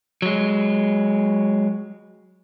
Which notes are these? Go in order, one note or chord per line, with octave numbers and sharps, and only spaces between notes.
F#3 G#3